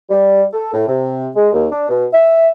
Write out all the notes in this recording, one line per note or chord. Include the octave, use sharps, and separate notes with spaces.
G3
A4
A2
C3
G#3
D#2
D4
B2
E5